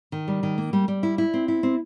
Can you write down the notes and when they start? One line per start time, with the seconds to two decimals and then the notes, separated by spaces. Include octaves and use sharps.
0.12 D#3
0.28 G3
0.43 D#3
0.58 A#3
0.73 G3
0.88 G3
1.03 E4
1.18 E4
1.34 C4
1.48 E4
1.63 C4